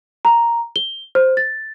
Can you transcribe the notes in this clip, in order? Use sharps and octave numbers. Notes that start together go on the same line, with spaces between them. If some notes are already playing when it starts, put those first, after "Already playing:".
A#5
G7
C5
A6